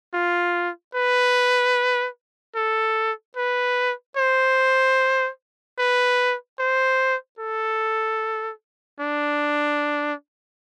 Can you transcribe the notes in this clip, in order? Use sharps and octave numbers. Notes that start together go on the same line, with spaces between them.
F4
B4
A4
B4
C5
B4
C5
A4
D4